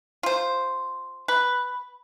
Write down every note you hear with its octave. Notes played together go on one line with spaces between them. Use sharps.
F4 C5
B4